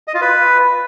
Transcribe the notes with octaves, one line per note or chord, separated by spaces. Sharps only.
D#5
F4
B4